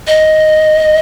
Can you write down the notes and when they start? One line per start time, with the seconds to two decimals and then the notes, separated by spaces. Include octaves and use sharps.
0.07 D#5